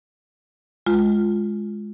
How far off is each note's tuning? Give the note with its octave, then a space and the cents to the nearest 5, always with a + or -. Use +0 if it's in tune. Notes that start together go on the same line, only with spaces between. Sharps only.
G#3 +10 F4 +0